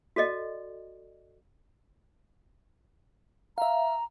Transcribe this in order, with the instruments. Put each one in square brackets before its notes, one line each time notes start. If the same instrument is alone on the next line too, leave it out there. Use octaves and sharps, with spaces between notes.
[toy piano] F#4 A4 D5 D#5
[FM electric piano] E5 F5 [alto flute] A#5